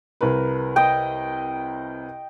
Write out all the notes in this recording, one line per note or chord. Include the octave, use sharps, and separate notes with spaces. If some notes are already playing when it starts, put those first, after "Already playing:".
C2 A#4 B4
D#5 G5